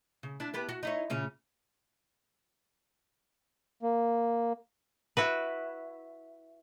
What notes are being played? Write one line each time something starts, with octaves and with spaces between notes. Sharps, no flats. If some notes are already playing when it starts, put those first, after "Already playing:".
C#3
D4 E4
B3 G4 B4
F#4
D#4 E4 C#5
A#2 C#3 C#4
A#3
E4 F#4 B4